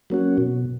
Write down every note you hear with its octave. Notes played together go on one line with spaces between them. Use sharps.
F#3 A#3 C#4 F#4
B2